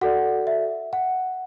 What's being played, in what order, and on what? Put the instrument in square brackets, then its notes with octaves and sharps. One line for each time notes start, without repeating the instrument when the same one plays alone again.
[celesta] F#4 A4 D5 F#5
E5
F#5